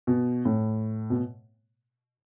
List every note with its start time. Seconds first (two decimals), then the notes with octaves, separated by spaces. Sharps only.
0.07 B2
0.45 A2
1.10 B2